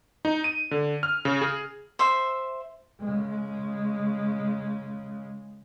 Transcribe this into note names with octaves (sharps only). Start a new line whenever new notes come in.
D#4
D#7
D3
F6
C#3
G#4
C5 E5
C#3 G#3